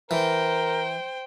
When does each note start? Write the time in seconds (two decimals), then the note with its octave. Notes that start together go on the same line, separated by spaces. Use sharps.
0.11 E3 A#4 C5 G5